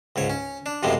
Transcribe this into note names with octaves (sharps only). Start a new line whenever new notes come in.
C#2 G#2 C#5
C#4
D4
F#2 A2 C3 F3 G#3